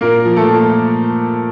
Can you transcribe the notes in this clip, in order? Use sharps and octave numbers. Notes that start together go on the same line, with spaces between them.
A#2 A#3 A#4
F3
A3 A4
A#2